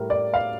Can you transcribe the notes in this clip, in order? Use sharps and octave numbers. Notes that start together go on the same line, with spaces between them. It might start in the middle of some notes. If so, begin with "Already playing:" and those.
Already playing: A2 G3 A#4
D5
F5